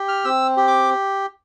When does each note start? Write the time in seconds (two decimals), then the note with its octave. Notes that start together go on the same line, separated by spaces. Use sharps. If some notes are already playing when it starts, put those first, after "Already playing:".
Already playing: G4
0.08 F6
0.25 C4 E6
0.57 G4
0.67 D6